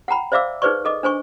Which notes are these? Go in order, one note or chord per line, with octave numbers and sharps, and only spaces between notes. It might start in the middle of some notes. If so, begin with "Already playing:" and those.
F#5 G5 A#5 B5
C5 D5 E5 F5 D6 E6
D#4 G#4 B4 C5 D5 C#6
A4 D#5 D6
D4 C5 G#5 C#6